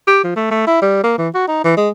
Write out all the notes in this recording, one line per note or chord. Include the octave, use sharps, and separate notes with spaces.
G4
F3
A3
A3
E4
G3
A#3
E3
F#4
D#4
E3
G#3